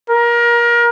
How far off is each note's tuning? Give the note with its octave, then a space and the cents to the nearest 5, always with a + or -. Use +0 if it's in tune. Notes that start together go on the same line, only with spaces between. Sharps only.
A#4 +25